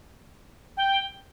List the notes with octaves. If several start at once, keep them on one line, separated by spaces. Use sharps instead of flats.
G5